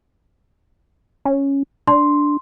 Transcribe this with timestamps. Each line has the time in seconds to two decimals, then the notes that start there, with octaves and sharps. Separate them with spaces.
1.25 C#4
1.87 D4 C6